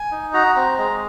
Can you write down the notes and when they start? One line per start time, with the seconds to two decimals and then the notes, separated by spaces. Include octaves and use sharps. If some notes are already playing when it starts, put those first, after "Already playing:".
Already playing: G#5
0.12 D#4
0.34 F#4 A#5
0.55 C4 A#5
0.78 G#3 A#5